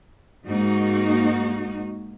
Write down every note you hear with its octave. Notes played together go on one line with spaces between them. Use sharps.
G#2 A#3 D#4 F#4